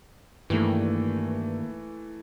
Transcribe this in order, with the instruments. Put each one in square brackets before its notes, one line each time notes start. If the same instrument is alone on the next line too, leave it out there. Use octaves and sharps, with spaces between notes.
[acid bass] G2 [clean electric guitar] D#3 A#3 [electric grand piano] E3 A3